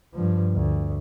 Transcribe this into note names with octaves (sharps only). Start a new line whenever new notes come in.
G2 F3
D2